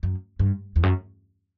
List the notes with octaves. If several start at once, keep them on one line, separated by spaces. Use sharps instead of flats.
F#2
G2
E2
F#2